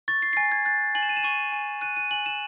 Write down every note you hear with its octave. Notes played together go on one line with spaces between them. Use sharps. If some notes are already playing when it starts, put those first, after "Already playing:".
C#6 A6
C7
C7
G#5 A6
G#6
F#6 A6
G#5 F#7
E7
D#7
E7
C#6 D#7
G#5
F#6 D#7
D#7
G#5 F#7
E7